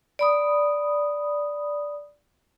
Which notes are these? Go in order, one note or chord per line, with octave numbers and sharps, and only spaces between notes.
D5 B5 D#6